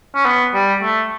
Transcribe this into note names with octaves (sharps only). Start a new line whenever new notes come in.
C#4
B3
G3
A3